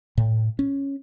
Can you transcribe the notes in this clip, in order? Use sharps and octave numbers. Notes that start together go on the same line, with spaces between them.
A2
C#4